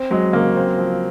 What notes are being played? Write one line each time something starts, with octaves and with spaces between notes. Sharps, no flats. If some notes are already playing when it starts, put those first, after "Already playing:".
Already playing: C4
F#3 G#3
C#3 A#3
C4
F3